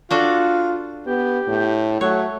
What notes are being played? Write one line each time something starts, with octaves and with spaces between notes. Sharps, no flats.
D4 F4 F#4 A4
B3 G4
A2
F#3 A3 C#5